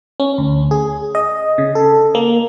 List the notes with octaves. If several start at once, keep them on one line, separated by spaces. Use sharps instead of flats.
C#4
D2
G#4
D#5
C#3
A4
A#3